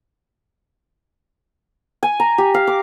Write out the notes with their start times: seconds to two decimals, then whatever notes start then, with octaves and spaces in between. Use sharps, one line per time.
2.03 G#5
2.20 A#5
2.38 G4
2.54 F5
2.67 D6